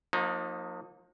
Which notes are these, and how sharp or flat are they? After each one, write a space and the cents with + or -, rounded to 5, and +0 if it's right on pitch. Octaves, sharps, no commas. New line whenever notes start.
F3 +40 A#3 +0 D#4 +0